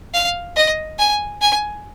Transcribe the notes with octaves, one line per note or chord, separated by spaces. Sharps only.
F5
D#5
G#5
G#5